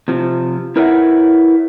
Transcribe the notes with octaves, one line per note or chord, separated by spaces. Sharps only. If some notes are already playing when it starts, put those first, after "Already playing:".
C3 F3
E4 A#4 B4 C#5 E5 F#5